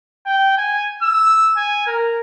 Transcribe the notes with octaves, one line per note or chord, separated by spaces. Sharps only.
G5
G#5
E6
G#5
A#4